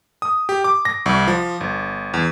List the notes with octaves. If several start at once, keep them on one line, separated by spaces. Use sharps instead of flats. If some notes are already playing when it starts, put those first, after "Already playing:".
D#6
G4
D6
A#6
C2
F3
G1
E2